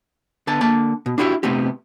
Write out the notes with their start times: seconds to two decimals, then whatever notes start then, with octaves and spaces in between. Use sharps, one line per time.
0.47 D3 B3 A5
0.61 D3 A#3 A5
1.06 B2
1.18 D4 E4 F#4 G4 C5 E5
1.43 C3 A3 B3 C4 G4